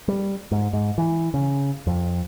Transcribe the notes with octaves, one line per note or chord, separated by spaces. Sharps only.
G3
G#2
G#2
E3
C#3
F2